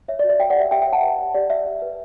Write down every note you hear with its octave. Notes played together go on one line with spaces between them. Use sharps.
C#5 E5
D5
F#4
D5
C#5 E5 G5
D5 F#5
G4 E5
G4 E5 G5
E5 G5
C#5
F#5 A5
B4
G4
G4 D5
D5 E5
G4
B4